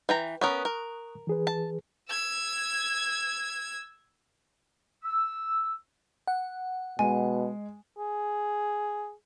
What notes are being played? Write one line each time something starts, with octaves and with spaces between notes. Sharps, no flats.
E3 G5 A#5
B3 C#4 A#4 C#6 D#6 F#6
A#4
E3 G#4 B4
A5
E6 G#6
E6
F#5
B2 G#3 G#5
G#4